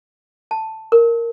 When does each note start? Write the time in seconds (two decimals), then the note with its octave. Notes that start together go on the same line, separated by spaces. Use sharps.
0.51 A5
0.92 A#4